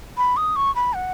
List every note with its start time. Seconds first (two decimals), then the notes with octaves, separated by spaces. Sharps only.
0.17 B5
0.37 D#6
0.56 C#6
0.75 B5
0.95 F#5